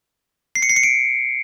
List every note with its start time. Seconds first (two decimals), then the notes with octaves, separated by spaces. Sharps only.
0.55 C7
0.62 C#7
0.69 C7
0.76 C#7
0.83 D7